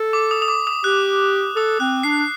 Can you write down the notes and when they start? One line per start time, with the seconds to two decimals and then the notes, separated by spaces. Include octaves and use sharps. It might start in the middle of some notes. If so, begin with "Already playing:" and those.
Already playing: A4
0.13 D6
0.31 D#6
0.42 D#6
0.48 D6
0.67 D#6
0.84 G4 F#6
1.56 A4 D#6
1.80 C4 F#6
2.03 D4 C7